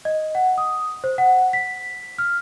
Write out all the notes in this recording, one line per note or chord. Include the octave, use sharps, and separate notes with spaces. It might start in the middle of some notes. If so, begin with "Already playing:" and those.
D#5
F#5
D#6
C5
F#5
B6
F6